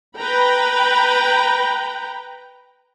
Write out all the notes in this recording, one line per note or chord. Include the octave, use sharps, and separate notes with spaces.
B4 G5 A#5 B5